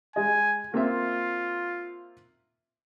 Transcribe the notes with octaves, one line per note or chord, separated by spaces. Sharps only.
G#3 D#5 G#5
A#3 C4 F4 E5